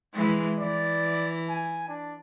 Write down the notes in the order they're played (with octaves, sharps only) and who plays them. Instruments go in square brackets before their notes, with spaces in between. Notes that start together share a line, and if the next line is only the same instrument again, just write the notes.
[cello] E3 G#3
[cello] E3 [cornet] D5
[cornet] G#5
D4